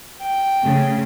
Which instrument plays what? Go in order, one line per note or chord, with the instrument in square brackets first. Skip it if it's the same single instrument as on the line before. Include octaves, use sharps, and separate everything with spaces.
[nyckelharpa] G5
[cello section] C#3 A3